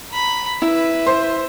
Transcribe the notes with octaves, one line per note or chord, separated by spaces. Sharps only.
A#5 B5
E4 B4 E5
C5